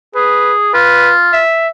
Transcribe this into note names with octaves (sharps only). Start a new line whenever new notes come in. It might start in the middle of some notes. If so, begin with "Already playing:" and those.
G#4 B4
F4 B4
E5